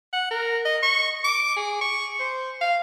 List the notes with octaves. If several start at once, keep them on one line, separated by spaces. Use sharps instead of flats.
F#5
A#4
D#5
C#6
D6
G#4
C#6
C5
F5